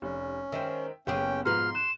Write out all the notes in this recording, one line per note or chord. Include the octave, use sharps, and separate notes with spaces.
F1 C#4
D#3 G#3 C4 E5 G5
F#1 B3 C#4 G4 G#4 G5
G#2 B2 F3 D#4 B4 C6 F6
F#6 E7